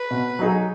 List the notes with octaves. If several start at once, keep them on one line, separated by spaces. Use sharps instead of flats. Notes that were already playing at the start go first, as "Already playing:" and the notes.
Already playing: B4
B2
F#3 D#4 G#4